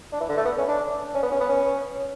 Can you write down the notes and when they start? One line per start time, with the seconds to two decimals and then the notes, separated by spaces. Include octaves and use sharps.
0.12 D4
0.20 E3
0.29 D3
0.37 A3
0.45 B3
0.58 C#4
0.68 D4
1.14 C#4
1.22 B3
1.31 C#4
1.40 B3
1.49 C#4